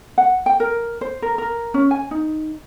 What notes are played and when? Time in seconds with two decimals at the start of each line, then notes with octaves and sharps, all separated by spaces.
0.18 F#5
0.46 G5
0.60 A#4
1.01 C5
1.22 A#4
1.38 A#4
1.74 C#4
1.91 G#5
2.11 D#4